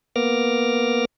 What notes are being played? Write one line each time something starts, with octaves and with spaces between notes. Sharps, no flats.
A#3 B3 D6 F6 A#6